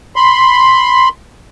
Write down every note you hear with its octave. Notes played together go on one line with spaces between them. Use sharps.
B5 C6